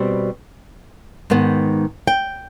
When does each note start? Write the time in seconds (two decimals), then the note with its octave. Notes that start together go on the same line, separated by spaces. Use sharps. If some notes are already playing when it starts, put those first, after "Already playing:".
Already playing: B2 G3 C4
1.30 G#2 D#3 B3
2.07 G5